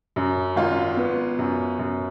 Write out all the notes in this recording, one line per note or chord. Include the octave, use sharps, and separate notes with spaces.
F#2
G#1 F4
B3
F#2
F#2